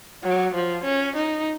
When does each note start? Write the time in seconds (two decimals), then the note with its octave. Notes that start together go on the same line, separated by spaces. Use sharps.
0.24 F#3
0.54 F3
0.84 C#4
1.16 D#4